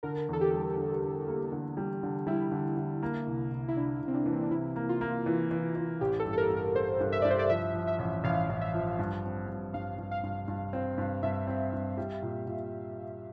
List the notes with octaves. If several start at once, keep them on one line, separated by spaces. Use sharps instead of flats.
D3 A#4
E2 A4
G4
G3
D3
D3
A#3
D3
G3
D3
G3 E4
D3
D3
A#3
C2
C2
E4
C2 D4
C2
C4
D4
E3 A#3
C4
D4
C3 E4
A#3
F4
A#3
E3
E3
E3
A1 G4
A4
G2
A4
A#4
G2
A#4
G2 C5
G2
E5
G2 D5
C5
D5
F3 E5
F3
E5
A1
A1 F5
A1
E5
F3
G2
C4
G2
G2 F5
G2
F5
G2
G2
C4
G2
G2 E5
C4
G2
G3
A#2
A#2